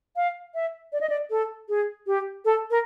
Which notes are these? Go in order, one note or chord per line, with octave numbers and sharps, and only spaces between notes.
F5
E5
D5
D#5
D5
A4
G#4
G4
A4
A#4